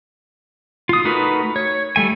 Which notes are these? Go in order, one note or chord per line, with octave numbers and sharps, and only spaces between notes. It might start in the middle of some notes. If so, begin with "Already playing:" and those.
F4 D#6
A3 D#4 F#4 A#4 B4
C#5
G3 A3 G#5